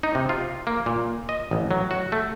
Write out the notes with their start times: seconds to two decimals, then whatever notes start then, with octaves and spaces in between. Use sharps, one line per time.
0.03 D#4
0.15 C3
0.29 F4
0.67 A#3
0.86 A#2
1.29 D#5
1.51 A1
1.71 F#3
1.91 F#4
2.12 A3